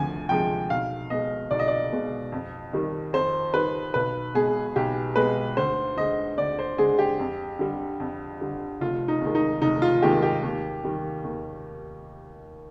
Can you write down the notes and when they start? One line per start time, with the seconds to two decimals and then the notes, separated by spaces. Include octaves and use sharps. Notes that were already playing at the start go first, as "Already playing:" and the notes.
Already playing: D2 C3 F3 G#5
0.29 C3 F3 G#3 G5
0.70 B1 F5
1.10 B2 G#3 D#5
1.51 B1 D5
1.59 D#5
1.68 D5
1.92 B2 G#3
2.32 F2
2.73 D#3 G3
3.13 F2 C5
3.54 D#3 G3 B4
3.94 B1 B4
4.34 B2 G#3 G#4
4.76 B1 G4
5.16 B2 G#3 B4
5.57 D2 C5
5.97 D3 G#3 D#5
6.37 D2 D5
6.59 C5
6.78 D3 G#3 G#4
6.99 G4
7.19 F2
7.59 D3 G3
8.00 F2
8.41 D3 G3
8.81 F1 F4
9.08 D#4
9.21 D#2 D#3 G#3
9.35 D#4
9.62 F1 D#4
9.82 F4
10.02 D#2 D#3 G#3 G4
10.22 G4
10.43 D#2
10.84 D#3 G3
11.24 D#2